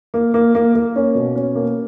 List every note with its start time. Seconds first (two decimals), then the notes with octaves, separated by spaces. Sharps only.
0.14 A#3
0.34 A#3
0.55 A#3
0.75 A#3
0.96 C#4
1.15 B2
1.36 C#4
1.55 A#3